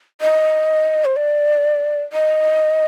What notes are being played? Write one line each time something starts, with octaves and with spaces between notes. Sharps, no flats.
D#5
C5
D5
D#5